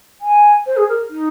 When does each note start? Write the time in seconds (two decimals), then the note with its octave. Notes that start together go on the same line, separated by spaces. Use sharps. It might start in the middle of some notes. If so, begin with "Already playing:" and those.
0.21 G#5
0.66 C5
0.77 G#4
0.89 A#4
1.10 D#4